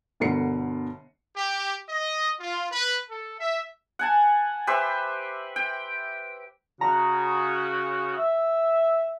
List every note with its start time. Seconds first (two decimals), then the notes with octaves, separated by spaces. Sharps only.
0.20 G1 B2 D3 A#4 C7 C#7
1.35 G4
1.89 D#5
2.40 F4
2.71 B4
3.09 A4
3.40 E5
3.99 F#5 G#5 A5
4.67 G4 B4 C5 E5
5.56 G5
6.81 C#3 F#4 A#5
8.18 E5